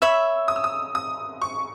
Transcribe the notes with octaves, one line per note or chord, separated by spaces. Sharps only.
C#5 E5 B5 E6
D#6
E6
D#6
D#6
C#6